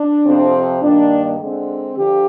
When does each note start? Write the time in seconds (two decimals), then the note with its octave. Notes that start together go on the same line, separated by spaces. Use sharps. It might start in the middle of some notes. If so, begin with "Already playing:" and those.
Already playing: D4
0.24 F2 C3 F3 C4
0.81 G2 D#3 A#3 D4
1.39 D3 G#3 C4
1.96 D3 F3 G4